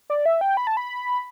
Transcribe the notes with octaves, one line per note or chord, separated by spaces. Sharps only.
D5
E5
G5
B5
A5
B5